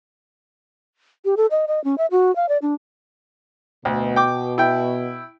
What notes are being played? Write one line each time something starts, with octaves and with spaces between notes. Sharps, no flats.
G4
A4
D#5
D#5
C#4
E5
F#4
F5
D5
D4
D2 B2
G5 D6
E4 G5